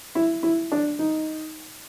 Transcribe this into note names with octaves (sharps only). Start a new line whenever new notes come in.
E4
E4
D4
D#4